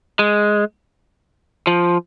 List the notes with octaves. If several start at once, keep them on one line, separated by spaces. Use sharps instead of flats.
G#3
F3